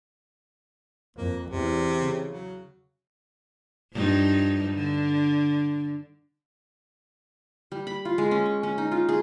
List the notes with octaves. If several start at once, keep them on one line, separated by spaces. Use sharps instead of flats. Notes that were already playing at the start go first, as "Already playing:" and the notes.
F2 A#3
E2 C3
C#3
F#3
G2 F3 D#4
D3
G3
B5
F4
G#3
C#4
C#6
C#4
D#4
F4
G#4